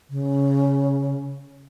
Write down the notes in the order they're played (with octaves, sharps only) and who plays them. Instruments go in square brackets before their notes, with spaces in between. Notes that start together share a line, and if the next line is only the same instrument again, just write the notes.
[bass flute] C#3